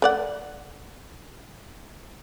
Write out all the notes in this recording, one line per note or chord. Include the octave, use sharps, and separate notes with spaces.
A3 D5 F#5